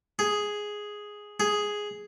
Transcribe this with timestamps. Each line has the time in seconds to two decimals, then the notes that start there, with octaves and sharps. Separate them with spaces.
0.19 G#4
1.40 G#4